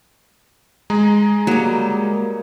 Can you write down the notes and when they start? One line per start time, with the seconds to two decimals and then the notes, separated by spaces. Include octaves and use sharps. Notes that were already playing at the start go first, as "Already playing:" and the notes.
0.90 G#3 G#4 A#5
1.47 F#3 G3 A#3